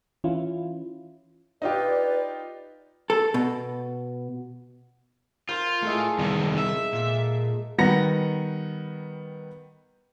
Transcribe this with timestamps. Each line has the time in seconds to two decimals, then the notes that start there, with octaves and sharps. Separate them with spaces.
0.24 E3 C#4 E4 F4
1.62 D#4 F4 G4 B4 D5
3.10 A4
3.34 B2
5.49 F4 A#4 C5
5.83 G#3 A3 E4 A4 F5
6.19 E2 C3 D#3 F3 G3
6.58 E5
6.93 A#2
7.78 D#3 G3 B3 A#5 A#6 C#7